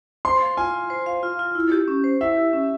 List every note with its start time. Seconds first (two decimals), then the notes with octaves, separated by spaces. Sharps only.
0.25 C5 C6
0.41 F5
0.57 F4 G#5
0.74 F4
0.90 C5
1.06 F5
1.23 F4
1.39 F4
1.55 E4
1.72 G4
1.88 C#4
2.04 C5
2.21 E4 E5
2.37 G4
2.53 C#4